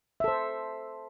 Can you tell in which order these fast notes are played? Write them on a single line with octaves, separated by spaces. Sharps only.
E5 A4 C5